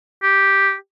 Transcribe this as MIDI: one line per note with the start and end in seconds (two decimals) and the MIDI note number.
0.23 0.74 67